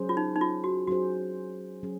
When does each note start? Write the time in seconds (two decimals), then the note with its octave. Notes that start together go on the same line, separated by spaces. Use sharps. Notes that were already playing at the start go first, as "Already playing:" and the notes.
Already playing: F#3 C#4 G#4 C5
0.09 F4
0.17 D#4
0.36 D#4
0.41 F4
0.64 F#4
0.87 F#3 C#4 F#4 G#4 C5
1.83 F#3 C#4 G#4